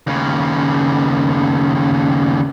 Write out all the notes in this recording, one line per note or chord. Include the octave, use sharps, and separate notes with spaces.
D#2 C#3